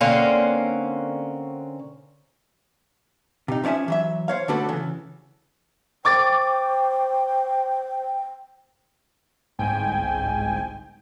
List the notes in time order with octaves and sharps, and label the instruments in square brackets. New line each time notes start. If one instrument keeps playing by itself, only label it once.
[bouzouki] D3 A#3 C4 C#4
[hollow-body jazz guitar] C3 D#4
F3 C#4 D5 E5 G#5
E3 F#3 E5
C5 C#5 F5
D3 A3 D4 F#4 A4 B4
C#3 E3
[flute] C5 [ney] G5 [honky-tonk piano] C#6 D6 A6
[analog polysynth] G1 C2 G#2 G5 G#5